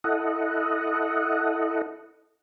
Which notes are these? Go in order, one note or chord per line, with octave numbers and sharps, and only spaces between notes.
E4 A4 D#5 F#5